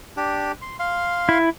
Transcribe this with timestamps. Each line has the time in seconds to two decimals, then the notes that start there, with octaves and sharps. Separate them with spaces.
0.17 D4 G4
0.62 C6
0.79 F5 C6
1.29 E4